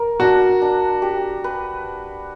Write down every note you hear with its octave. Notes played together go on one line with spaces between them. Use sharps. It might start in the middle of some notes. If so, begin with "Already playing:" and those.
Already playing: A#4
D4 F#4
D4
G4
B4